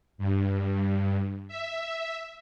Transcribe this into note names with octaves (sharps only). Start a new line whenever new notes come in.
G2
E5